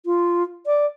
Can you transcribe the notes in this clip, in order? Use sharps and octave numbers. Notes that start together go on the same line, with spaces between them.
F4
D5